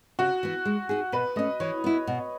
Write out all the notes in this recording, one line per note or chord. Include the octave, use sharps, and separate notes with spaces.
C#3 F#4
E3 B3
G#3
D#4 G#4
B2 B4
A3 C#4 D#5
E3 C#5
B3 E4
B2